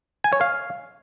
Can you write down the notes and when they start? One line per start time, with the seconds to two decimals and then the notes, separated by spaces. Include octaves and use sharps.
0.24 G#5
0.33 C#5
0.41 F5